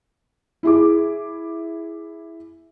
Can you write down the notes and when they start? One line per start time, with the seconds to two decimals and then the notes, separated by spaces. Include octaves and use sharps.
0.63 E4 G#4 D6